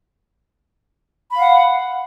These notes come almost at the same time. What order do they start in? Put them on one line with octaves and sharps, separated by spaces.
B5 F5 F#5